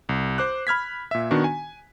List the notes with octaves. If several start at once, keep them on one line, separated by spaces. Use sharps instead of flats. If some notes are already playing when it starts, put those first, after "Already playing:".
C2
C5 D6 F#6
B5 F6 G#6 B6
A#2 E5
D#3 B3 D4 F#4
G#5